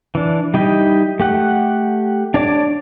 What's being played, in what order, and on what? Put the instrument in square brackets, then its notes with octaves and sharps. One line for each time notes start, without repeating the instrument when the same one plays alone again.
[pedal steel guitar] E3 D4
G3 D#4 E4 G4 D#5
A3 G4 F#5
D4 C#5 D5 D6